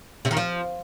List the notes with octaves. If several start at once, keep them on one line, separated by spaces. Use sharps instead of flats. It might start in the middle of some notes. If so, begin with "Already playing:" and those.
C3
D#3
F3